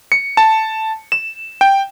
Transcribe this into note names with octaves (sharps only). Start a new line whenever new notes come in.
C#7
A5
E7
G5